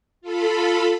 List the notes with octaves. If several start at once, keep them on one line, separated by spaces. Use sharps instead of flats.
F4 A4 B5